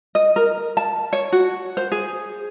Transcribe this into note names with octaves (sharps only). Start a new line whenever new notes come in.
D#5
A#4
A5
C#5
F#4
C5
G#4